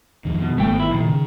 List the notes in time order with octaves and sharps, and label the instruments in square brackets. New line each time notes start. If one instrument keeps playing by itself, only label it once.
[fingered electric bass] F2 D#3
[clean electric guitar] B2
[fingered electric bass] G#1 D#3 B3 [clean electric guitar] A3 G5
[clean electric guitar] E4
[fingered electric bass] A#2 E3 [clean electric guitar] D#3
[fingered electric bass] C#3